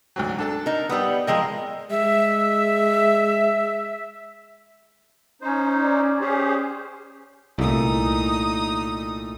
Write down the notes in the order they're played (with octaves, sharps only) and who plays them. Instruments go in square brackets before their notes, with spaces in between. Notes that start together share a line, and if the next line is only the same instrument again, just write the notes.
[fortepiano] D2 G#2 F#3
D4 A4 A5
[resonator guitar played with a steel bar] D#4 A#4
[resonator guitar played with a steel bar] G3 B3 [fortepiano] B4 D#6 E6
[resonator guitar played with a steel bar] F3 G#3 A#4 [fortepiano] D#5 G5 E6
[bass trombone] G#3 [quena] E5
[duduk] C#4 [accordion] D#4 C5
[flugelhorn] D5
[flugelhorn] C#4 [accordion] G4 G#4 C5
[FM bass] C2 [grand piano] A#2 A3 E4 [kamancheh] D#4 D#6